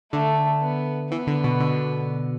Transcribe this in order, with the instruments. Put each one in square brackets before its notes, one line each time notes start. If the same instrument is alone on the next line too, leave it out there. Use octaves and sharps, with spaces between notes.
[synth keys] D3 [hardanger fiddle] A3
[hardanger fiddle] B3
[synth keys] E3 [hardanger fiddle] B3
[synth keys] D3
B2
D3